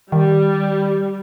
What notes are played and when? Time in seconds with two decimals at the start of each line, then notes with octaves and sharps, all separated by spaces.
0.12 D#3 G3